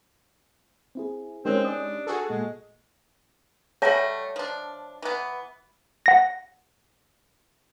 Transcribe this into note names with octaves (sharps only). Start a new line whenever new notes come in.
C4 E4 G#4
G#3 C4 C#4 D#4 G4 A#4 C5 C#5
D4 D#6
F#4 G#4 A4
A#2 G#3
G3 A3 C#5 E5 F#5 A5
F3 D4
E3 B3
F#5 A#6